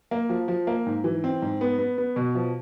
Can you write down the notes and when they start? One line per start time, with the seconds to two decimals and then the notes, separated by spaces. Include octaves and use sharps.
0.11 A#3
0.29 F3
0.48 F3
0.67 A#3
0.86 G#2
1.04 E3
1.24 C4
1.42 G#2
1.61 B3
1.79 B3
1.98 B3
2.16 B2
2.35 F3